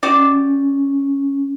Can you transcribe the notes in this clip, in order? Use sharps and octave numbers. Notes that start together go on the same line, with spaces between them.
C#4 F#4 G4 D5